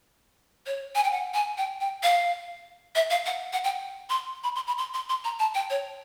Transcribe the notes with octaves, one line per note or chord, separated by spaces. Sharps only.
C#5
G#5
G5
F#5
G#5
G5
G5
F5
E5
F5
F#5
F#5
G5
C6
B5
C6
B5
C6
C6
C6
A#5
A5
G5
C#5